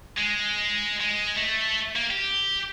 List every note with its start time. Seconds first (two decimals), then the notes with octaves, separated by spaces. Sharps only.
0.17 G#3
1.00 G#3
1.37 A3
1.96 A#3
2.11 G4